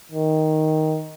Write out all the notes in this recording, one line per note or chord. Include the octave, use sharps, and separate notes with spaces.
D#3